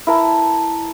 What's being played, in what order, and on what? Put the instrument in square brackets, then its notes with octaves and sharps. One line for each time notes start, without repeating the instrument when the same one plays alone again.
[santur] E4 A#4 A5